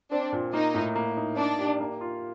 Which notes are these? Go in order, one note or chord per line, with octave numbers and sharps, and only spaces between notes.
C4 D4
A#2
A#3 D#4
A2
A#3
D#4
D4 D#4
G4
A#3
F4